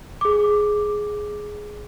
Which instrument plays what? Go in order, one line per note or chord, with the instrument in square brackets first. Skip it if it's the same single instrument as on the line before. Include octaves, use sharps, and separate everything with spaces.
[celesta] G#4 D6